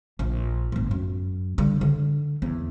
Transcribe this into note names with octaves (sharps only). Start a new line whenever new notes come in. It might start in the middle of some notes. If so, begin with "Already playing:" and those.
A#1
G1 A2
F#2
D3 G3
D3
E2